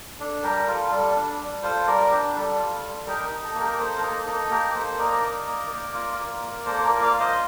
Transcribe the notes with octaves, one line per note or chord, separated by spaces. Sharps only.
D4 A4
G3 G4 A#4
F4 A4
G3 A4
D4
G3
F4 A4 C5
G3 A#4 D5
D4 G4
G3 A4
F4
G3
D#4 G4 A#4
D#4
A4
A#3 A4
G4 A#4
A#3 A4 C5
A#4
D#4 A4
D#4 A4
A#3 G4 A#4
A#3 A4 C5
D#4 A#4 D5
D#4
A#3
A#3
F4
F4
A#3
A#3 A4 C5
A#4 D5
F4
D5 F5
F4
C5 D#5